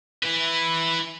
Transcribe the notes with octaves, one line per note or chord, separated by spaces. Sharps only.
E4 B4